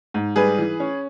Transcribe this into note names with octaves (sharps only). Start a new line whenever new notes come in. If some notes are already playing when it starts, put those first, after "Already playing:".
G#2
G3 G#4 B4
E3
C#4